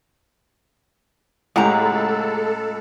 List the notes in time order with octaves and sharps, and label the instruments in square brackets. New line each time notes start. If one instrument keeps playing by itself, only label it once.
[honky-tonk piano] C#2 [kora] A2 G4 [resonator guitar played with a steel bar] G#3 F#5 A#5 [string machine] A4